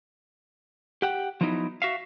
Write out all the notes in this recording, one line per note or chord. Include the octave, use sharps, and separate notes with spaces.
G4 F#5 G5
F3 F#3 B3 C#4 D#4 E4
F#4 E5 F5